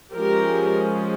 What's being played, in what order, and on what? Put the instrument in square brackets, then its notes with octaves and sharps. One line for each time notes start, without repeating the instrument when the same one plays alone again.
[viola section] F3 G#3 C#4 G4 A#4